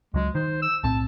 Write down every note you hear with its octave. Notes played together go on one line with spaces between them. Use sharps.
C#2 F#3 G#3
D#3 C5
E6
B1 A2 C4 A5